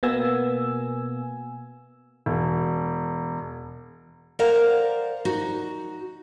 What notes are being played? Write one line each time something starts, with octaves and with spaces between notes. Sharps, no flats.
B2 A#3 B3 G#5 E6
E1
A#4 C5 D5 F5 F#5 A#5
D#4 F#4